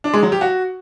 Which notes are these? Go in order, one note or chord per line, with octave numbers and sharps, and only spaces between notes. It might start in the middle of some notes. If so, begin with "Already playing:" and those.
D4
G#3
F#3
G4
F#4